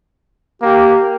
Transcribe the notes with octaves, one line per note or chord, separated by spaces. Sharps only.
A#3 G4